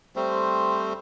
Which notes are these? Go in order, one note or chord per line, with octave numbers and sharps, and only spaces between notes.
G3 A3 C4 C5